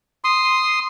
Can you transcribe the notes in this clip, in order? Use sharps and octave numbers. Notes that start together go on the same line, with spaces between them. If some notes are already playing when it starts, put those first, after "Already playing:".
C6 D#6